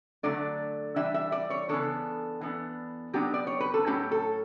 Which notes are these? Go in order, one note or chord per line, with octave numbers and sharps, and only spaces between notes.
D3 F#3 A3 D4 D5
E3 G3 D4 E5
E5
D5
C#5
C#3 E3 B3 D4 A4
E3 B3 D4
F#3 B3 D4 G4
D5
C#5
B4
A4
A2 F#3 C#4 G4
A4